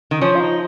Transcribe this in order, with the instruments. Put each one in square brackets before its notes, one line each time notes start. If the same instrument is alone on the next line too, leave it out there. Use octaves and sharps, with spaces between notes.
[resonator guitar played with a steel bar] D#3
[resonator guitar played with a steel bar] F3 [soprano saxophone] C#4
[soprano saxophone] F4
D#4